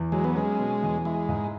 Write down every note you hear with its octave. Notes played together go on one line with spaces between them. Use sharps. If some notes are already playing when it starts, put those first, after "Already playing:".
Already playing: E2
F#3 G#3
B3
G#3 C#4
B2
E2
G#3 E4
G#2